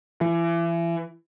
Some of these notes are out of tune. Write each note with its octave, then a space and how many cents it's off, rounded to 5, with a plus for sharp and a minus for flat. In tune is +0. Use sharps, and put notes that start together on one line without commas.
E3 +35